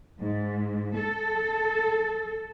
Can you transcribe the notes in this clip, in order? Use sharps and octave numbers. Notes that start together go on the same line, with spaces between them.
G#2
A4